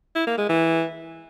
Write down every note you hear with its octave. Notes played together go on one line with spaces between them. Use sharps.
E4
A#3
G#3
E3